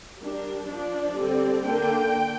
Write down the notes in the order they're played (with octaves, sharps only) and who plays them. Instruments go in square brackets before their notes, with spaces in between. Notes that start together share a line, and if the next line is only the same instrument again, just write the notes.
[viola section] G3 D4 A#4
F3 D4 D5
D3 G3 C4
D3 A#3 D4 G5